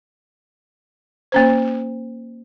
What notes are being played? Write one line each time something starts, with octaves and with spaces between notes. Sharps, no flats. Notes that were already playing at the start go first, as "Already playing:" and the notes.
A#3 C#4 C5